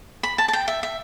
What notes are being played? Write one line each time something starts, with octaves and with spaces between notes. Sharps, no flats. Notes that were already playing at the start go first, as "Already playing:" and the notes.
B5
A5
A5
G5
E5
E5